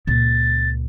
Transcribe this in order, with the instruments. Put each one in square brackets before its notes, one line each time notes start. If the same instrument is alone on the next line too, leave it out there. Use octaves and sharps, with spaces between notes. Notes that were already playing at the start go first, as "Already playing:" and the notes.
[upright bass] C#2 A#2 [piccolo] A6